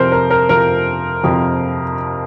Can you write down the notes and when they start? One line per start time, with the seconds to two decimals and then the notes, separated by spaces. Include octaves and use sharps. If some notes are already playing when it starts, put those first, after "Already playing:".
Already playing: F2 C3 F3 A#4 C5
0.12 A#4
0.31 A#4
0.49 F2 C3 F3 A#4
1.24 F2 C3 F3